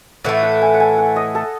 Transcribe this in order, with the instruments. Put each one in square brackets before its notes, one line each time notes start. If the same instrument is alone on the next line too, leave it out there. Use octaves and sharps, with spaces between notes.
[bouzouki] A2 E3 A3 [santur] F#5
[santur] F#5
G#5
F#5
G#5
F#5
D#5
A4